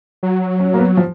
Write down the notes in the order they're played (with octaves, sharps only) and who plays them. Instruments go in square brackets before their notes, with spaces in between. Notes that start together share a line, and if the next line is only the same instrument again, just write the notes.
[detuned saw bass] F#3
[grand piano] C#4
A#3
B3
F3